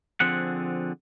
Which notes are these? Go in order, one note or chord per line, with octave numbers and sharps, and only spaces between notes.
D3 F3 C4 G#4 F#5